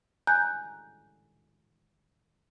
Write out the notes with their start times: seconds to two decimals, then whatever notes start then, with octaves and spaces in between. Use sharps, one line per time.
0.27 G#5 A#5 F#6 G6